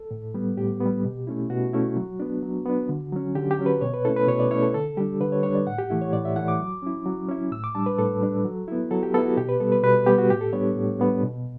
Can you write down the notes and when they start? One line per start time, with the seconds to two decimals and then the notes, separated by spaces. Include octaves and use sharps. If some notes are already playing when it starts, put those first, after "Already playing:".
Already playing: A4
0.11 A2
0.34 G3 B3
0.57 A2 G4
0.80 B3
0.85 G3
1.04 B2
1.27 A3 C#4 E4
1.50 B2 F#4
1.73 A3 C#4 E4
1.96 F#3
2.20 B3 D4
2.42 F#3
2.66 B3 D4
2.89 D3
3.12 F#3 C#4
3.35 D3 G4
3.51 G4
3.59 F#3 C#4
3.66 B4
3.81 B2 C#5
3.93 B4
4.05 A3 C#4 E4 A4
4.16 B4
4.28 B2 C#5
4.40 D5
4.51 A3 C#4 E4 C#5
4.62 A4
4.74 D3 A4
4.97 G3 D4 G4
5.21 D3 B4
5.32 C#5
5.43 G3 D4 C#5
5.55 D5
5.67 A2 F#5
5.78 G4
5.90 E3 A3 E4
6.01 C#5
6.13 A2 D5
6.25 E5
6.36 E3 A3 E4 F#5
6.48 D6
6.59 F#3
6.82 C#4 E4
7.06 F#3
7.29 C#4 E4
7.52 A2 E6
7.64 D6
7.75 G3 D4 A5
7.86 B4
7.98 A2 A4
8.21 G3 D4
8.45 F#3
8.68 B3 E4
8.91 F#3 A4
9.03 G4
9.14 B3 E4 A4
9.26 F#4
9.37 B2 G4
9.49 B4
9.60 G3 B3 A4
9.72 B4
9.83 B2 B4
10.06 G3 B3 G4
10.18 F#4
10.30 A2 G4
10.41 A4
10.53 G3 B3 D4 C#5
10.76 A2
11.00 G3 B3 D4
11.22 B2